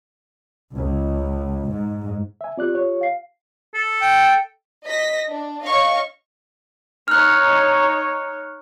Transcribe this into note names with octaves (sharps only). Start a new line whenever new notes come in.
C#2
G#2
E5 G#5
C4 F4 G4 D5 F#6
C#5
F5 C7
A4
G5
D#5 A#6 B6
D4
C#5 D#5 F5 C#6
D#4 C#5 F6 F#6